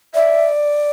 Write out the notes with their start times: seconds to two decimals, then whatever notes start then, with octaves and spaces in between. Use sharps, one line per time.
0.14 D5 E5